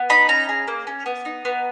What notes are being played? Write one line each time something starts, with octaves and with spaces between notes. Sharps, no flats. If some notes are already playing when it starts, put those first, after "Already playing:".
Already playing: B3
D#4 B5
C#4 A#5
G#4
A#3
C#4
B3
D#4
B3